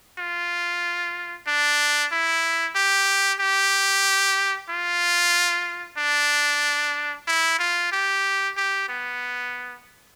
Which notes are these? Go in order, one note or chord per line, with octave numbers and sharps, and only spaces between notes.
F4
D4
E4
G4
G4
F4
D4
E4
F4
G4
G4
B3